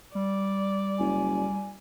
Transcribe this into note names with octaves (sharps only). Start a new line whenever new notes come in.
G3 D5
F#1 G#5